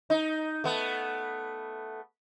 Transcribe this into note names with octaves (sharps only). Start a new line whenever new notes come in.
D#4
A3 B3